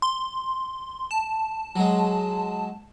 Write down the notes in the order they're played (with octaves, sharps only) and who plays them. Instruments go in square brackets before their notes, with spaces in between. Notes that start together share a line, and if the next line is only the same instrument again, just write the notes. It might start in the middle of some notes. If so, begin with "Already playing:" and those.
[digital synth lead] C6
A5
[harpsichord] F#3 G#3